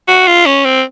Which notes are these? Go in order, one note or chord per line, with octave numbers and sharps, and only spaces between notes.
F#4
F4
C#4
C4